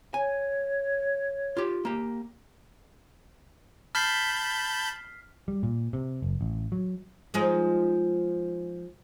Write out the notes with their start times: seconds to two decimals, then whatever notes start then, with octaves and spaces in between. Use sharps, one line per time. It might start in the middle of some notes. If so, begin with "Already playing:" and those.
0.14 C#5 G#5
1.57 F4 G4
1.85 A#3 G4
3.95 A5 B5 F6 G6 B6 C7
5.48 G3
5.63 A#2
5.93 C3
6.22 F#1
6.41 A1
6.72 F#3
7.34 F3 G#3 D#4